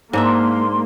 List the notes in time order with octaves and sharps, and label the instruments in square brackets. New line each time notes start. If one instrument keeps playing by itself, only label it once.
[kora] G#2 D4 E5 [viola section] A#3 [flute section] C6